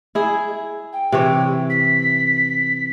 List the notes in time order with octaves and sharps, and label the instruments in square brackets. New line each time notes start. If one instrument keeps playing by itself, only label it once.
[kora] E4 G#4
[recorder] G5
[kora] C3 E3 C#5
[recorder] B6